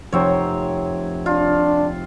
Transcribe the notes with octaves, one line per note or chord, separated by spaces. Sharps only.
F1 C4 A#4 C#5
D4 F4